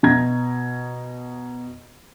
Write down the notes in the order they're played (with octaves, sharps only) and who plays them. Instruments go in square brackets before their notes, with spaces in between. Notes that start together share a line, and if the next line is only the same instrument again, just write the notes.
[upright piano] B2 A#5 G#6 A#6